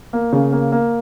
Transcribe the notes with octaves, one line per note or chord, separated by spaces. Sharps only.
A#3
C#3
A#3
A#3